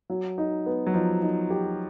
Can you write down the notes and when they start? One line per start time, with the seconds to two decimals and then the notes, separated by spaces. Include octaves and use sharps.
0.10 F#3
0.38 D#4
0.66 B3
0.86 F#3
0.94 F3 D#4
1.22 D#4
1.50 G4